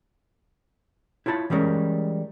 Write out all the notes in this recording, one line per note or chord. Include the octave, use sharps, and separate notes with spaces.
E4 F4 C#5 A5 B5
E3 G3 G#3 C#4 A#4